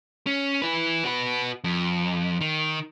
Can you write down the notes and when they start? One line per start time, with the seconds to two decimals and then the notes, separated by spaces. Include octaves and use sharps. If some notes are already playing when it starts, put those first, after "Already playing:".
0.26 C#4
0.62 E4 B4
1.05 F#4 B4
1.64 F2
2.41 D#3